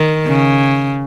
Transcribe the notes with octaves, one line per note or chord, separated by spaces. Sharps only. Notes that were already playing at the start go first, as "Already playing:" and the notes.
Already playing: D#3
C#3